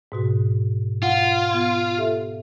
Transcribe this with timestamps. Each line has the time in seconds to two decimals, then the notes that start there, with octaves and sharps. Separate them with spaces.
0.12 G#2 B2 F#4
1.03 F4 F#5
1.51 B3 G#6
1.98 G4 A4 E5